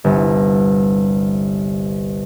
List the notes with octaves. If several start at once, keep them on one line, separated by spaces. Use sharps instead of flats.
G1 C2